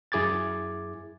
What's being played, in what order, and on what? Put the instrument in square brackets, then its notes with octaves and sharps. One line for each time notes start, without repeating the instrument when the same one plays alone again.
[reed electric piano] F#2 E4 G#4 D6 G#6 A6